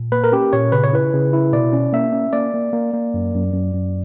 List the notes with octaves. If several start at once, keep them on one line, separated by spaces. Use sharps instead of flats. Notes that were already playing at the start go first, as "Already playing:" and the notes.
Already playing: A#2
A#3 B4
A#4
C#4 G4
A#2 C#5
C#3 B4
C#5
E4 B4
C#3
E4
B2 D5
C#4
A#3 E5
C#4
A#3 D5
A#3
A#3
A#3
F#2
F#2
F#2
F#2